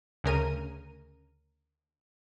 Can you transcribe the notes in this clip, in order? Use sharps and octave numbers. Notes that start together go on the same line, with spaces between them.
D2 C#3 A#4 D#7